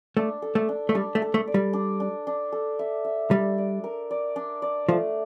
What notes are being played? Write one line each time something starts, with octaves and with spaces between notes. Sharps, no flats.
A3 D4
A4
A3
D4
A3
G3 D4
A3
A4
A3
D5
G3
D4
D4
D4
A4
E5
E5
G3 D4
D5
A#4
D5
D4
D5
F3 A3